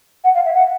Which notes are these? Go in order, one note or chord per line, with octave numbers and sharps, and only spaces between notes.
F#5
F5
E5
F#5